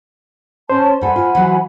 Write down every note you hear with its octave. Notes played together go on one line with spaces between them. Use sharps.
C#4 C5 A5
G2 A4 F#5 G#5 B5
F4
E3 F#3 F#4